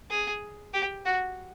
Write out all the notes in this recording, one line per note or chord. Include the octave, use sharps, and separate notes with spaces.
G#4
G4
F#4